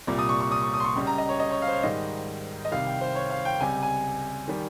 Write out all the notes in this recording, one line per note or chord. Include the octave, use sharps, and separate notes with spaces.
C2 A#2 G3
D#6
C#6
C#6
D#6
C#6
D#6
C6
C#6
C#2 C#3 G3
A#5
D#5
C#5
D#5
C#5
F5
C5
C#5
G#2 D#3 G3 D#5
D#5
C2 C3 D#3 G3 F5
G5
C5
C#5
F5
G5
C#2 C3 G3 G#5
G#5
D#3 G3